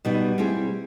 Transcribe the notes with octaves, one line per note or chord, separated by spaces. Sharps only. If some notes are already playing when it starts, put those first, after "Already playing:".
B2 G3 B3 D#4
G3 C4 E4 G#4